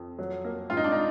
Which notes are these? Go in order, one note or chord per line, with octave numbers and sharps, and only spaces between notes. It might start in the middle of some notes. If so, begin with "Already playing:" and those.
Already playing: F2
F#3
A#3
G#2 F4
D#4
D4
D#4